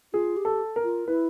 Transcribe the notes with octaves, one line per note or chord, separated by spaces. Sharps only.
F4 G#4
G4
A4
A#4
F4
E4 B4